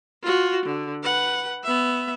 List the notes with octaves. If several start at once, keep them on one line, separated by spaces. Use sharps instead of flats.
F4 F#4
D3
B4 F#5
B3 E5